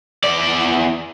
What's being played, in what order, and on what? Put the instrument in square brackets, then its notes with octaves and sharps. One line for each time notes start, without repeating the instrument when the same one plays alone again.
[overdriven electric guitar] E2 D5